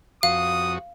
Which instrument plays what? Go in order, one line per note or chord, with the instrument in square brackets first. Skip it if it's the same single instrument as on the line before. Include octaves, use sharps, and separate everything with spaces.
[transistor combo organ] F2 F#4 [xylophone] F5 [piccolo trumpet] D#6